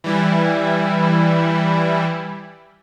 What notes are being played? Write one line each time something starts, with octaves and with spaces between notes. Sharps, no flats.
E3 G3 E4